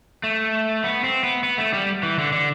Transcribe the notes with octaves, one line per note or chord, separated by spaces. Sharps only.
A3
B3
C4
B3
B3
A3
G3
E3
D3
D3